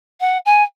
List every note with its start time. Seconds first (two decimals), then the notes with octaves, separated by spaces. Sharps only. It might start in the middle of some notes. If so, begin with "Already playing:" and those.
0.20 F#5
0.45 G#5